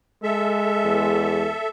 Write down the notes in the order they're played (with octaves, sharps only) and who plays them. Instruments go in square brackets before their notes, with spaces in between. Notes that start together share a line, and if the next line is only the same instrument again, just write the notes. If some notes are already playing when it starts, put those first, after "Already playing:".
[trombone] G#3 [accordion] A4 E5
[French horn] E2